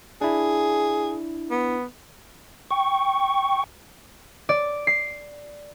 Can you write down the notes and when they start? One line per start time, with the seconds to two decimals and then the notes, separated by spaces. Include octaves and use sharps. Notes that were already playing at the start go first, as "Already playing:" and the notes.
0.21 D4 E4 G#4
1.51 B3
2.71 G5 C#6
4.49 D5
4.87 C7